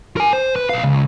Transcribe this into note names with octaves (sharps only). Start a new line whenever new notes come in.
A#4 G#5
C5
B4
B1 F5
C#2